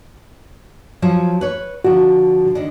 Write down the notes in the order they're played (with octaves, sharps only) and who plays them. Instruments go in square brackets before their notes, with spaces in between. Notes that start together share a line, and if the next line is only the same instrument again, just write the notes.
[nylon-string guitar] F3 F#3 C#4
B4 C#5
[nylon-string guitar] D3 F3 [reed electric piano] F#4
[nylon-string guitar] D3 D#3